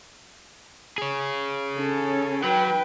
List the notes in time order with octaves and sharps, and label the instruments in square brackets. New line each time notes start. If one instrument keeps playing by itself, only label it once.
[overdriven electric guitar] G#4 C#5
[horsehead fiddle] C#4 A4
[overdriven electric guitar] F#3 [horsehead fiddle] B4 G5